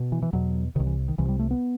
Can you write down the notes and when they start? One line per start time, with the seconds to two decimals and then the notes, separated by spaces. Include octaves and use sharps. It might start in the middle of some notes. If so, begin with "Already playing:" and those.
Already playing: B2
0.12 E3
0.22 E3
0.33 E2 B2 F#3
0.76 C3 D#3
0.80 C2
0.86 E3
1.08 D#3
1.18 C2 C3 E3
1.29 G3
1.39 A3
1.51 B3